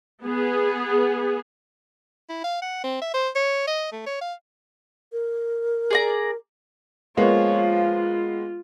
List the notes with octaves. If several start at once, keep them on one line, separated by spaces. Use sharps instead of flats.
B3 G#4
E4
F5
F#5
C4
E5
C5
C#5
D#5
A3
C#5
F5
A#4
G#4 D5 A#5
F3 G#3 A#3 B3 F4 C#5
F4